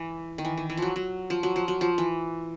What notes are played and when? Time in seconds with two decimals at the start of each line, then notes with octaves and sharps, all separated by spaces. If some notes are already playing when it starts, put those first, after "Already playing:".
Already playing: E3
0.38 D#3
0.45 E3
0.58 D#3
0.70 E3
0.77 F3 F#3
0.96 F#3
1.30 F3
1.43 F#3
1.56 F3
1.68 F#3
1.81 F3
1.98 E3